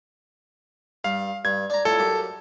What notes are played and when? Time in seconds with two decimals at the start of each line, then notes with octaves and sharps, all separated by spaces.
1.04 G2 F5
1.45 G2 G#6
1.70 D4 A#5
1.85 F2 A2 A4
1.99 F#2 G4